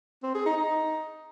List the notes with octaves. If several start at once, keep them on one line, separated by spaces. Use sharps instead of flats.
C4
G#4
D#4
D#4